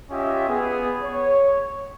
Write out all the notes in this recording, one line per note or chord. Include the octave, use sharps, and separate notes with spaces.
C#4 F4 G4 D#5 E5
B3 G#4
C#5